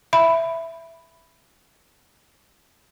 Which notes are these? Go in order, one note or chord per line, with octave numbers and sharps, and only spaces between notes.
E5 B5